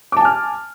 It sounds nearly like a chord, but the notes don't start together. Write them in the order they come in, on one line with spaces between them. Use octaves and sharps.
D6 A5 G#5 F6